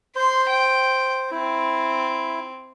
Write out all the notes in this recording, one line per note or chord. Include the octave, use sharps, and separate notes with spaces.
C5 C6
G5
C4 E4